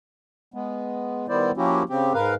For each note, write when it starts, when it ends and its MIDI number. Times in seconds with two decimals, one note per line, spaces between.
0.54 1.26 56
0.54 1.26 59
1.29 1.51 51
1.29 1.51 55
1.29 1.51 59
1.29 1.51 64
1.29 1.51 72
1.29 1.51 74
1.57 1.83 53
1.57 1.83 58
1.57 1.83 61
1.57 1.83 64
1.57 1.83 66
1.57 1.83 67
1.89 2.13 49
1.89 2.13 60
1.89 2.13 67
2.14 2.35 44
2.14 2.35 70
2.14 2.35 71
2.14 2.35 77